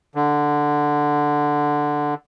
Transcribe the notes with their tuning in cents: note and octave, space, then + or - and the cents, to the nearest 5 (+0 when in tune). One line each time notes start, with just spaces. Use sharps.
D3 +5